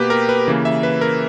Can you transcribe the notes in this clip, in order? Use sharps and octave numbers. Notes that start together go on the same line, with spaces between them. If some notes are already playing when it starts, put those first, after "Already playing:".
Already playing: B2 A#3 G4 B4
A#4
B4
C#3 E3 A#3
E5
B4
A#4